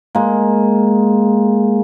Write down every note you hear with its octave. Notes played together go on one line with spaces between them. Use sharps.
G#3 A#3